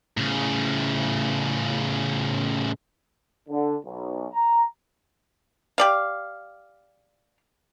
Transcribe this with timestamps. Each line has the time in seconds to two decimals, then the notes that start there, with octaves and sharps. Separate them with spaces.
0.17 A2 C#3
3.49 D3
3.84 B1
4.33 A#5
5.78 G4 D5 F5